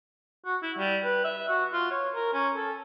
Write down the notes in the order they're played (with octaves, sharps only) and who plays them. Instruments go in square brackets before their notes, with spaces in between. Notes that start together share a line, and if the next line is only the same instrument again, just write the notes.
[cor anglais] F#4
E4
G3
B4
E5
F#4
F4
C#5
A#4
C#4
A4